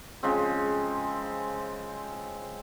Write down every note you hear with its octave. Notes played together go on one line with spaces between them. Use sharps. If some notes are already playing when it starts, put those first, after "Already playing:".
C#3 F3 G#3 C4